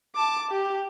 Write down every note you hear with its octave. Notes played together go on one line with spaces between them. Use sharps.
A5 D6
G4